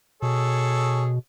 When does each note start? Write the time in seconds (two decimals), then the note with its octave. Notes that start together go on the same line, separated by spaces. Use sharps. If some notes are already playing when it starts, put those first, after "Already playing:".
0.22 B2 G#4 A4 C#5